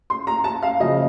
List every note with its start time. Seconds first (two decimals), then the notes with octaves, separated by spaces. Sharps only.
0.10 C6
0.27 A#5
0.44 A5
0.63 F5
0.80 F#1 F2 C#3 F#3 D#5